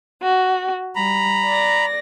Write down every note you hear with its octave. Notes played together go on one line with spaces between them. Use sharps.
F#4
G3 A#5 B5
D5 A#6